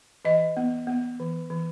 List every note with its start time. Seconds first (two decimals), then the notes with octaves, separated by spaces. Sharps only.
0.25 E3 D#5
0.57 B3
0.87 B3
1.20 E3
1.50 E3